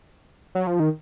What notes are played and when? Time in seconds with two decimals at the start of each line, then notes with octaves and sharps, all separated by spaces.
0.55 F#3
0.67 F3
0.80 D#3